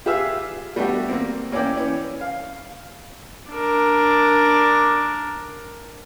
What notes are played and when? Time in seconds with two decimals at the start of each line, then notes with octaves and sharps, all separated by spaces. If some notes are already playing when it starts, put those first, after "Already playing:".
0.06 F4 G4 G#4 B4 E5 F5
0.76 G3 A3 B3 D4 F#4 G4
1.09 A#3 C4
1.52 A#3 C#4 E4 D5 G5
1.77 E3 C#4
2.21 F5
3.50 D4 A#4